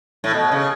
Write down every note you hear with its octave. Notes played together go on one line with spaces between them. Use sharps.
A2
B2
C#3